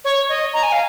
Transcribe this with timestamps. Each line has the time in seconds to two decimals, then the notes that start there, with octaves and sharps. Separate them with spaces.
0.05 C#5
0.29 D#5
0.54 A#5
0.63 G#5
0.72 F5